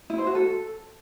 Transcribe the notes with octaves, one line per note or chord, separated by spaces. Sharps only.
E4
C5
F#4
A4